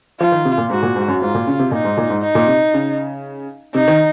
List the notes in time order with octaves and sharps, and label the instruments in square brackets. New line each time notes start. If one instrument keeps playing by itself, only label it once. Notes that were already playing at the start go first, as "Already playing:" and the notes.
[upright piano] F3 [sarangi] F4
[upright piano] D#3
C3
A#2
[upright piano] G#2 [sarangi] F#4
[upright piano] A#2
G#2
F#2
[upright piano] G#2 [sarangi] F4
[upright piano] A#2
C#3
C3
[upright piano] A#2 [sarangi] D#4
[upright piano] G#2
A#2
G#2
[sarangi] D#4
[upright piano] A#2
C3
C#3
[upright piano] C3 [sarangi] D#4
[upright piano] D#3